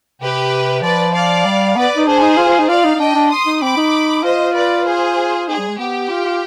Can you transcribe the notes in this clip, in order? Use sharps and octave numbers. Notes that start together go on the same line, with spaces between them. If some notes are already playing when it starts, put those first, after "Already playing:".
C3 G4 B4
F3 B4 D5
D5 F5
G3
B3 B4 D5
D#4
D4 G#4 C5
D#4
F4
F4
D#4
F4 D5 F5
D#4
D#4
D4 D#5 G5
D4
C6 D#6
D#4
C4 B5 D6
D#4
F4 C5 D#5
B4 D5
G#4 C5
D#4 G#4
G3
G#3
B3 G4
F4
F4